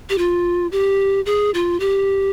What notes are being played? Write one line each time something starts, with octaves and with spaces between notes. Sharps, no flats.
G4
F4
G4
G#4
F4
G4